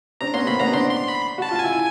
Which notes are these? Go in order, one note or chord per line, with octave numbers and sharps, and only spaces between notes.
C4 D4 A#5
B3 C#4 C6
A#3 C4 B5
B3 C#4 A#5
C4 D4 C6
C6
B5
F#4 A5
F4
E4 G#5